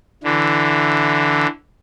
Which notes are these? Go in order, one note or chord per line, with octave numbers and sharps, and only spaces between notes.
D3 E3